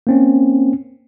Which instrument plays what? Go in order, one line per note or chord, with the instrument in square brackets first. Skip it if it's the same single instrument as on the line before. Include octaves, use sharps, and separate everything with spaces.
[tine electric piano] A#3 C4 C#4